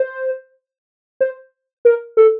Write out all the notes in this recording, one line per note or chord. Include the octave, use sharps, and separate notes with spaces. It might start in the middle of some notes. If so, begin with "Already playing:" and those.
Already playing: C5
C5
A#4
A4